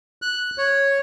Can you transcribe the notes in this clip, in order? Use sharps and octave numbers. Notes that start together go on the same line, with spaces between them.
F#6
C#5